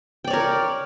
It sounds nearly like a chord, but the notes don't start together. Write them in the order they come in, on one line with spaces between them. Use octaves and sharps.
G5 D5 C#5 A#4